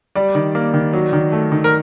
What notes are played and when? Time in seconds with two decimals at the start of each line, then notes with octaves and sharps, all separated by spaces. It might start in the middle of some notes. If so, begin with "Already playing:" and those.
0.15 G3 D5
0.35 D#3
0.55 A#3
0.74 D#3
0.93 F#3
1.13 D#3
1.32 A3
1.52 D#3
1.64 A#4